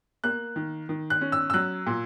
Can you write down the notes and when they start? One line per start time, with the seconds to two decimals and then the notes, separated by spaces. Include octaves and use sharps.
0.24 A#3 F#6
0.56 D#3
0.89 D#3
1.10 F#6
1.21 C#4
1.32 E6
1.50 E6
1.54 F#3 F#6
1.87 A#2